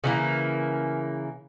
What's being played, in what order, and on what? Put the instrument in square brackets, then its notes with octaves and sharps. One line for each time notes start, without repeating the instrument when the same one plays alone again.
[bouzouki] C#3 E3 A#3